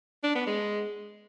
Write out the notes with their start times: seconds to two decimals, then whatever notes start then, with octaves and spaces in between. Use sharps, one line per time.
0.24 D4
0.35 B3
0.47 G#3